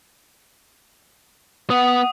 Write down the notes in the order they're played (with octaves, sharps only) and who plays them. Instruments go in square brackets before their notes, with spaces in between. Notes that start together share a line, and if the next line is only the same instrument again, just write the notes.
[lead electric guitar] B3 [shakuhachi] F#5 [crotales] D#6